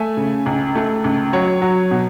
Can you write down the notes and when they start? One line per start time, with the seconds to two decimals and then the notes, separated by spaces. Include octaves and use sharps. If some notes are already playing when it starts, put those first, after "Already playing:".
Already playing: A3 E5 G#5
0.17 C#3
0.46 C#2
0.75 A3
1.04 C#2
1.33 F#3 C#5
1.62 F#3
1.91 B2